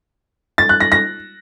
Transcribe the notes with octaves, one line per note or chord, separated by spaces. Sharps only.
A6
F#6
A#6
A#6